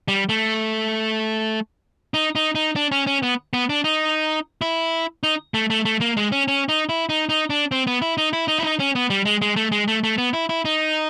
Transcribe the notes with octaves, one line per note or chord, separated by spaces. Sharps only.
G3
A3
D#4
D#4
D#4
D4
C#4
C#4
B3
B3
D4
D#4
E4
D#4
A3
A3
A3
A#3
G#3
C#4
C#4
D#4
E4
D#4
D#4
D4
C4
B3
E4
D#4
E4
D#4
E4
D#4
C#4
B3
G3
G#3
G#3
A3
G#3
A3
A3
B3
E4
E4
D#4